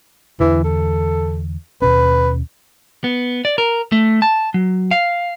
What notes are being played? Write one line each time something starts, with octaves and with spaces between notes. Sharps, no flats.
E2 D3 E3
A4
D#2 B2 C#4 B4
B3
D5
A#4
A3
A5
F#3
F5